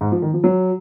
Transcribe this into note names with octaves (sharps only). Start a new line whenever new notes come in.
G#2
F3
D#3
F3
F#3